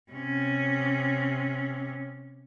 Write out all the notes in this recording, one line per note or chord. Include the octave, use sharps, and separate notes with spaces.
C3 C#4